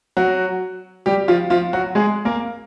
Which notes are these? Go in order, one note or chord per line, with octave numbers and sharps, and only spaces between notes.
F#3 F#4
G3 G4
F3 F4
F3 F4
F#3 F#4
G#3 G#4
A#3 A#4